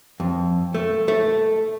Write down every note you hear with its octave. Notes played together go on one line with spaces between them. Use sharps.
F2
A3
A3